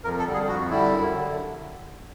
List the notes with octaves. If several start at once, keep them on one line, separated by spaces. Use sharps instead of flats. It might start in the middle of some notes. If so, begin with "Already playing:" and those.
F2 A#4
A4
D3 G3
G#4
F2 F#4
D3 G3 E4
F#2
D3